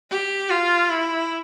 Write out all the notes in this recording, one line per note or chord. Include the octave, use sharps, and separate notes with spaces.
G4
F4
E4